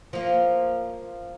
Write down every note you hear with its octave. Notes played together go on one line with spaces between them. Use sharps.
F3 A#3